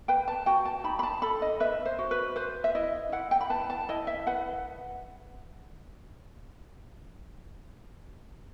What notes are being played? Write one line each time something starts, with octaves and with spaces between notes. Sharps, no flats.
B4 G5
A5
F#4 G5
A5
D#4 B5
B5
A5
A4 B5
D#5
B4 E5
C5
F#4
B4
B4 C5
E5
E4 D#5
E4 F#5
G5
B5
B4 A5
A5
E4 D#5
E5
B4 F#5